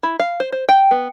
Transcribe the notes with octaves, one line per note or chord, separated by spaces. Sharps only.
E4
F5
C5
C5
G5
B3